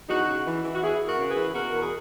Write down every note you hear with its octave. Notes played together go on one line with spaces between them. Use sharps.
E2 D#4 F#4
C#3
E3
E3
F#4
E2 E4 G#4
E2
F#4 A#4
C#3
G#4 B4
E3
B2 F#4 A#4
E2
G#4